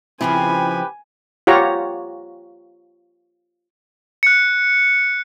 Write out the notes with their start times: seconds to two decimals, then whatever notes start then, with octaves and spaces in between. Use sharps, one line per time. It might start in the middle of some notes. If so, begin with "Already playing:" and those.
0.21 C#3 F3 C4 E4 G4 B4 G#5 B5
1.47 F4 G4 C#5 F#5 A#5
4.23 F#6 C#7